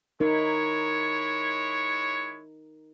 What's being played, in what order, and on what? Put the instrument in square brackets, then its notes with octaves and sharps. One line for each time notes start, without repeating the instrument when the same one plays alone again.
[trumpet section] G#3 E4 C#5 [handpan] D#4 A#4